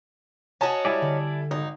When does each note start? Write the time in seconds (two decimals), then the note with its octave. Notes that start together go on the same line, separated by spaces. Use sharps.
0.61 C#4 D#4 F#4 G#5 A5
0.85 G3 E4 D5 G#5 A5
1.02 D3
1.51 G#1 D#4